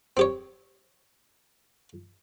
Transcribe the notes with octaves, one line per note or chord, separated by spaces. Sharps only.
C4 G4 C#5